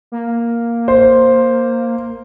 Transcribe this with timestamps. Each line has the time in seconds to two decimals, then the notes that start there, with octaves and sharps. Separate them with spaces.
0.12 A#3
0.88 C5